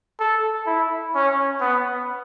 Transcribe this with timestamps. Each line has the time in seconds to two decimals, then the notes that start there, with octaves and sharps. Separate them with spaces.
0.20 A4
0.67 E4
1.15 C#4
1.61 B3